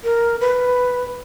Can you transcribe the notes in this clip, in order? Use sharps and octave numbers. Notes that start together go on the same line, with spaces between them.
A#4
B4